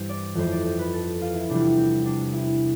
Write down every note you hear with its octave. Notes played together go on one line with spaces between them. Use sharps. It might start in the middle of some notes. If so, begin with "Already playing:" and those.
Already playing: G2 E3 G3 C5
D5
F2 E3 A3 C5
D5
C5
B4
A4
F4
E4
E2 C3 E3 G3 D4
C4
D4
E4